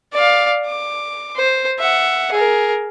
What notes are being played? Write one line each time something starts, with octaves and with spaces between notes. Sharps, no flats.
D5 F5
D6
C5
E5 F#5
G#4 A#4